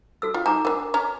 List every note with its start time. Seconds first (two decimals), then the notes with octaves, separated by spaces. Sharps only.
0.22 F#4 A4 E6
0.34 F4
0.46 D#4 G#5 A#5 D6
0.65 D4 A#4 F#5
0.94 C#4 A#5